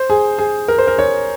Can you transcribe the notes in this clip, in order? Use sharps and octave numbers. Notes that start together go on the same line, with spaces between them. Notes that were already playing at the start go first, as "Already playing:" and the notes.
Already playing: C5
G#4
G#4
A#4
C5
A#4
C#5